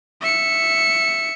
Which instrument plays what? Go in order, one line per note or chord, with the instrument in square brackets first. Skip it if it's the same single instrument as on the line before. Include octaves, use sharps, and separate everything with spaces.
[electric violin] E5 C#7